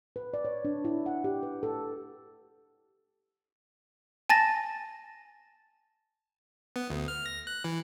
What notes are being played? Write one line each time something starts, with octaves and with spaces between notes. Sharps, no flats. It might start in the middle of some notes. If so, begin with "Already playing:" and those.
B4
D5
C#5
D4
E4
F#5
G4
B4
A4
G#5 A5 A6 A#6
B3
D2
F6
A#6
F#6
E3